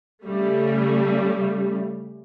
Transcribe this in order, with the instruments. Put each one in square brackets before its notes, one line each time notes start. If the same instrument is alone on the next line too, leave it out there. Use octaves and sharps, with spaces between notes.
[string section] C#3 G3 A3